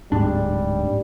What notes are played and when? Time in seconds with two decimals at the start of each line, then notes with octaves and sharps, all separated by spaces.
0.12 D1 G#2 G3 D4